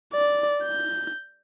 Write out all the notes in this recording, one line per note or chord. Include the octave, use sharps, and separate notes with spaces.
D5
G6